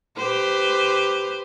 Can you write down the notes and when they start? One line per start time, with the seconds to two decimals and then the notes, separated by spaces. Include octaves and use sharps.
0.17 G4 B4 C5